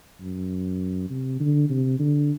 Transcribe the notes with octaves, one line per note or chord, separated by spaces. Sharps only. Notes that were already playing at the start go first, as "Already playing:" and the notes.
F#2
C3
D3
C3
D3